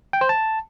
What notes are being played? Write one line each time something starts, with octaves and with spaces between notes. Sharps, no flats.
G5
C5
A5